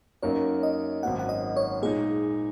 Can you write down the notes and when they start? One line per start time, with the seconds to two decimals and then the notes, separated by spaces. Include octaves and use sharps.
0.23 F#2 F#3 A#3 D#4 A#4 C#5
0.63 D#5
1.03 G#1 F#2 F#3 A#3 F#5
1.19 F#5
1.29 D#5
1.57 C#5
1.82 A#2 G#3 D#4 G#4